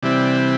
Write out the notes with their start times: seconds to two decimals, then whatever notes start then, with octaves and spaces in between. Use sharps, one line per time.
0.02 C3 E3 G3 C4 E4 D5